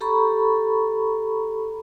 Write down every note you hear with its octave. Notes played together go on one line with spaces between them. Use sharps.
G4 A4 A#5 B5 C#6